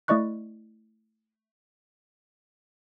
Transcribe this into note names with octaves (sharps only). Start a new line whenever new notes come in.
A3 E4 D5 D#5 C#6 F#6